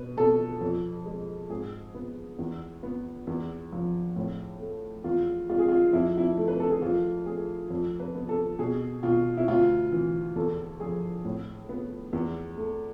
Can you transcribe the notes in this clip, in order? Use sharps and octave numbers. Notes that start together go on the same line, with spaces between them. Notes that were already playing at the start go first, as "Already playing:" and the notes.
Already playing: B2 B4
B2 A4
F2
G#3
G#2 G#4
B3
E2
B3
E2
F3
A2
A3
E2 F4
G#3 F4
G#4
F4
F2 E4
E4
A3
B4
A4
G#4
F2 F4
A3 G#4
F2
B4
B3
A4
B2 G#4
B2 F4
E4
D2 F4
E3
E2 A4
F3 G#4
A2
B3
E2
A3